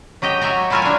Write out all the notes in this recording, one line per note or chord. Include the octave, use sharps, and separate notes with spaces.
F#3 G4 D#5 G5
F#4 E5 G#5 A#5
A3 E4 F4 A#4 E5 G#5
D4 G#5